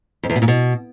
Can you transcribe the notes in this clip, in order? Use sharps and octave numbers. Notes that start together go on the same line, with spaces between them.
F2
E2
B2
A#2
B2